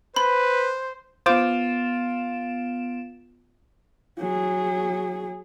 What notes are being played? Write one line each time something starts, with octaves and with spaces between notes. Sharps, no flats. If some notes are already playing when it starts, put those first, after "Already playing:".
B4 C5 B5
B3 F4 C5 D6 D7 E7
F#3 G#4